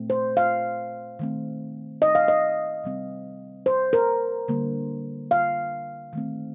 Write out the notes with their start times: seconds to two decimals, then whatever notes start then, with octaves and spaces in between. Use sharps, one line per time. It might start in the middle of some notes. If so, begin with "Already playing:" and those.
Already playing: A#2 A3 C4
0.10 C5
0.37 F5
1.19 D#3 A3 C4
2.02 D#5
2.15 F5
2.28 D#5
2.84 C3 G3 C4
3.66 C5
3.93 A#4
4.48 D3 G3 A#3
5.31 F5
6.13 D#3 A3 C4